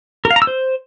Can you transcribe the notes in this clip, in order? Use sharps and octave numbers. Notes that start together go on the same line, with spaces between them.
A#4
F5
A#5
E6
C5